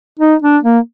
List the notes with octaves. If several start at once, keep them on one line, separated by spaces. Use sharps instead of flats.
D#4
D4
A#3